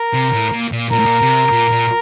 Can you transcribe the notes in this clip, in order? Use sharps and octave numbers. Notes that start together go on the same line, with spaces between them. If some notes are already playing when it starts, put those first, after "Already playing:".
Already playing: A#4
C3
A2
A#2
A#2
A#2 A#4
A2
A#2
C3
A#2
A#2